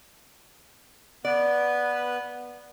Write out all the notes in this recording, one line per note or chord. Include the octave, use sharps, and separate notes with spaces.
B3 B4 D5